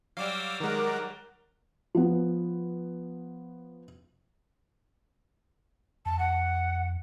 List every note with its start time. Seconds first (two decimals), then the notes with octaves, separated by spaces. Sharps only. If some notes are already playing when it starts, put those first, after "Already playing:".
0.17 F#3 G3 F5 D6 E6
0.60 D#3 G#3 A#4 F#5 D6
1.95 F3 B3
6.06 F2 A5
6.19 F#5